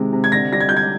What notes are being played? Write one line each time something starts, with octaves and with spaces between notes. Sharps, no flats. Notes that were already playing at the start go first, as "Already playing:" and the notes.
Already playing: C3 D#3 G#3
C3
G#6
D3 A#6
G3 A#6
G#6
G3 G6
G#6